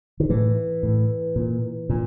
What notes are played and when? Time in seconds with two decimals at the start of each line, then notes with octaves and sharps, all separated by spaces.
0.20 D#3
0.30 A2 E3
0.83 A2
1.36 A#2
1.89 A#2